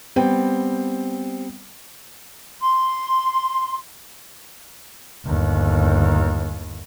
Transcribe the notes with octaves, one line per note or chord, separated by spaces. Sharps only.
G3 B3 C4 G5
C6
G1 D#2